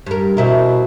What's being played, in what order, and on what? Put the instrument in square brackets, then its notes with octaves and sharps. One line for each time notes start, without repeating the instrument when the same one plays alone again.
[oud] G2 A#4
[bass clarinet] B2 [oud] C4 E4 A#4